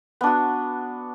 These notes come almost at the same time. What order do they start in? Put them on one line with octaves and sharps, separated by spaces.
B3 D4 F#4